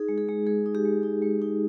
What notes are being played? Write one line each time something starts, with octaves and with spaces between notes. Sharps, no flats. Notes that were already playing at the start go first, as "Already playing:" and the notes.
Already playing: D#4 G#4
G#3
G#4
G#3
G#3 G#4
D#4
G4
G#3
D#4
G#3
D#4